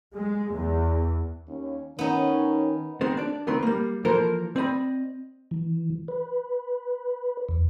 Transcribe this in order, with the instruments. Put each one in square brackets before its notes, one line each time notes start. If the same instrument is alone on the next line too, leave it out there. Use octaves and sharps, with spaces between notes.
[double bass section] G#3
E2
[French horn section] D#2 C#4
[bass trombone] D#3 [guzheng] B3 D#4 [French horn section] C#4
[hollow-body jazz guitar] D#3 G#3 B3 C4
D4 D5
C#2 D#3 C4 B4
G3 A#3
E3 F3 A#3 A4 A#4 C5
C4 D5 D#5 B5
[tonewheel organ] E3
B4
E2